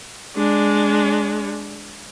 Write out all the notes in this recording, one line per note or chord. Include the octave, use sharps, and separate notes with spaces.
G#3 D4